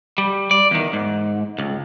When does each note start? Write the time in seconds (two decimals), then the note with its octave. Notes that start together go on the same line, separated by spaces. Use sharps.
0.18 G3
0.51 D5
0.71 E2 D#3
0.93 G#2
1.59 C#2